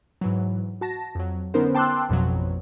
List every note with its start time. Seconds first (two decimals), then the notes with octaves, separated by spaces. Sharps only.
0.21 G#2 E3 F#3
0.81 F#4 A5 A#6
1.15 F2 F#3
1.54 D3 B3 C#4 D#4 A#4 C5
1.75 G5 A5 C6 D6 E6 F#6
2.09 A1 F2 B2 F3 F#3